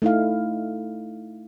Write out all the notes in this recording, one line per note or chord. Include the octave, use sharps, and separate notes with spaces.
A3 D#4 E4 F5